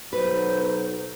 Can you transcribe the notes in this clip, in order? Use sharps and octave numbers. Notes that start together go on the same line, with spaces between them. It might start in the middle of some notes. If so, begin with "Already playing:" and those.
B1 F#3 B4 C5